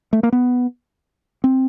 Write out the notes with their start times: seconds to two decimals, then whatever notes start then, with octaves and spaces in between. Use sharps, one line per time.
0.13 A3
0.23 A#3
0.33 B3
1.44 C4